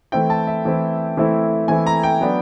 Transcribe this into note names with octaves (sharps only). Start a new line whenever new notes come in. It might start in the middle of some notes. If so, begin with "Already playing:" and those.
E3 A3 C4 E4 G5
A5
E5
E3 A3 C4 E4
E3 A3 C4 E4
E3 A3 C4 E4 G#5
A#5
G5
F#3 B3 D4